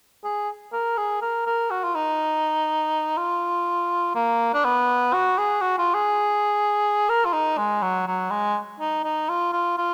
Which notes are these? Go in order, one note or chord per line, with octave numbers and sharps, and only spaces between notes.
G#4
A#4
G#4
A#4
A#4
F#4
F4
D#4
F4
A#3
D4
B3
F#4
G#4
F#4
F4
G#4
A#4
F4
D#4
G#3
F#3
F#3
G#3
D#4
D#4
F4
F4
F4